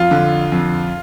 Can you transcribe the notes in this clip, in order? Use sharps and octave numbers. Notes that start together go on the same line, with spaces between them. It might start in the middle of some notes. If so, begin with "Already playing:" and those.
Already playing: F2 F4
D3
F2